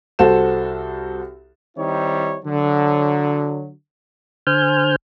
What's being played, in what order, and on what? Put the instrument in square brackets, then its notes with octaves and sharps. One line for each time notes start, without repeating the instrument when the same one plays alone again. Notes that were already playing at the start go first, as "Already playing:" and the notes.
[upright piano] C2 F#4 A4 C5 E7
[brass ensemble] D#3 G3 C4 D#4 E4 C#5
D3 F#3
[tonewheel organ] D3 C5 G#5 F6 G6